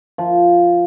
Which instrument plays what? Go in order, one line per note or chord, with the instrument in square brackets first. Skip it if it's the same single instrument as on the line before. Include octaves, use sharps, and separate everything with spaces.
[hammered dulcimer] F3